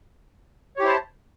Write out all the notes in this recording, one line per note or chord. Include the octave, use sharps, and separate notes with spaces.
E4 G4 C5 C#5 A5